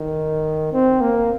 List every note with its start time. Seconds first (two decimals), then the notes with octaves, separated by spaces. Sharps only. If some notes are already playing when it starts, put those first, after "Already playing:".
Already playing: D#3
0.73 C4
1.01 A#3